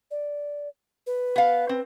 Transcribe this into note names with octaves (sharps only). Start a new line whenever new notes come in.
D5
B4
B3 F5
C4